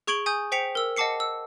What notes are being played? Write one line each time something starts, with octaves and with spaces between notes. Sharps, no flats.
G#4 C#6 G#6 D7 F#7 G7
G#5 D#6 G6
C5 G5 B6 C#7 F7
A#4 E6
D#5 F#5 A5 D6 C7 C#7
E6